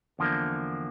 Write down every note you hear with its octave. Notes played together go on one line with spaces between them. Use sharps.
E2 D3 F3 A#3 D4